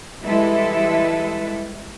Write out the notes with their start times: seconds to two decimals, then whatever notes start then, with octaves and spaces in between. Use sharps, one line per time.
0.22 E3 G3 G#3 E4 A4 B4